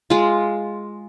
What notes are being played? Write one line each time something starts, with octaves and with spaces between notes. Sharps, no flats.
G#3 F4